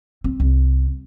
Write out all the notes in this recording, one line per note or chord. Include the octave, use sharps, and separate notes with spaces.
C4
C2